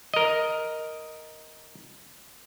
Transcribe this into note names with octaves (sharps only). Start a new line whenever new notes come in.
A#4 D#5